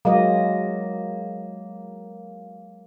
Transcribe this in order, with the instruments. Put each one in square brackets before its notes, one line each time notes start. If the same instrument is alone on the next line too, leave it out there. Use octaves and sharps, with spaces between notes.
[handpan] F#3 G#3 D#5 [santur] A#3